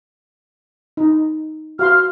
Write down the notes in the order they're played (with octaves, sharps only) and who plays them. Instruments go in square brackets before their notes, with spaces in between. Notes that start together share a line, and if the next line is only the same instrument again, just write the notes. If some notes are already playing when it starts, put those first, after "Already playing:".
[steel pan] D#4
[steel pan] F#4 F5 C6 [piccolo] F6